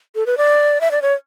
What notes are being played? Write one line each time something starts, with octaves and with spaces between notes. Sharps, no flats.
A4
B4
D5
E5
D5
C#5